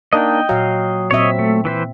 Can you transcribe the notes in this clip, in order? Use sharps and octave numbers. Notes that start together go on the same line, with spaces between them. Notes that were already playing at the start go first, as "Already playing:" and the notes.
A#3 D4 D#4 D#5 G5
A#2 F#3 F5
A#2 C4 C#5 D#5 E5
A3
E3 B4 C5